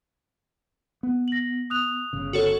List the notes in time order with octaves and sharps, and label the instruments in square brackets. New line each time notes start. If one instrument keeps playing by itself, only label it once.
[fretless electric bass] B3
[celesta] A#6 F#7
D#6 F#6 F7
[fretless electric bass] G1 C#3
[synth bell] F#4 A4 C#5